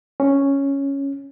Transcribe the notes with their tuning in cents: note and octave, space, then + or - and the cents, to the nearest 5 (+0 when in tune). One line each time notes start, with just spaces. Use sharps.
C#4 +0